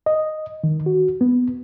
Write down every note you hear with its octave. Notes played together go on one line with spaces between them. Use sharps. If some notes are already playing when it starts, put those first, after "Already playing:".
D#5
D#3
F#4
B3